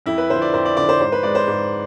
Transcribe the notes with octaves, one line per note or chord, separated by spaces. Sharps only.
F2 E4
B4
D3 F3 C5
D5
F2 C5
D5
D3 F3 D5
C5
G#2 C5
B4
G#3 D5
C5
G#2